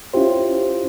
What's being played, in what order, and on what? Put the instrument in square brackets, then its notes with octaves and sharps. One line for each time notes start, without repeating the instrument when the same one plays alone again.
[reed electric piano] C#4 E4 F4 G4 C5